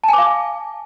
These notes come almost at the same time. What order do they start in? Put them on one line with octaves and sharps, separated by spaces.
A5 G#5 D6 F5